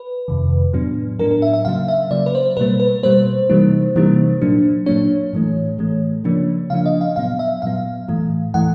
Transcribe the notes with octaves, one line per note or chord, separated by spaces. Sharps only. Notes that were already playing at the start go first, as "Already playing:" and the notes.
Already playing: B4
F2 C3 D#3
A2 F#3 B3 D4
A2 F#3 B3 D4 A#4
A#4
E5
E5
C#3 F#3 A#3 F5
E5
C#3 F#3 A#3 D5
B4
C5
B2 G3 A#3 B4
B4
B2 G3 A#3 C5
C3 E3 G3 A#3 D#4
C3 E3 G3 A#3 D#4
A#2 F#3 A#3 D4
A#2 F#3 A#3 D4 C#5
A2 E3 A3
A2 E3 A3
C#3 F3 A#3 D4
C#3 F3 A#3 D4 F5
D#5
F5
A#2 F#3 B3 F5
E5
A#2 F#3 B3 F5
A2 E3 A3
A2 E3 A3 F#5